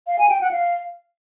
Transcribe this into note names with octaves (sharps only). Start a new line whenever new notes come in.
F5
G#5
G5
F#5
F5